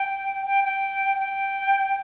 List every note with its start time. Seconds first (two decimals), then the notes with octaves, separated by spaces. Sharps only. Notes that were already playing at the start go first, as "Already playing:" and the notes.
Already playing: G5
0.46 G5
0.64 G5
1.20 G5